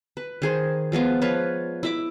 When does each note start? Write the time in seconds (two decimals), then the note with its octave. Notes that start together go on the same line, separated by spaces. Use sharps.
0.17 B4
0.42 D#3 G#4 C5
0.92 F3 G#3 B3 F4
1.22 F3 F4 B4 C#5
1.83 E4 E5 D6